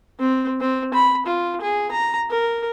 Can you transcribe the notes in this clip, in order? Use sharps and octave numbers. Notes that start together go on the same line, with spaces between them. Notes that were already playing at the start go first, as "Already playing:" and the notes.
C4
C4
B5
F4
G#4
A#5
A#4